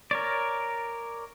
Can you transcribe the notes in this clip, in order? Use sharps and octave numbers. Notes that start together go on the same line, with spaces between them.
A#4 C#5 D5